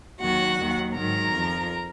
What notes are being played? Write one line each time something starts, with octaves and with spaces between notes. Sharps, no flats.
D#2 D#3 F#3 F#4 F#5
D#2 D#3 F#3
G#2 D#3 F#3 A#4 A#5
F2 F3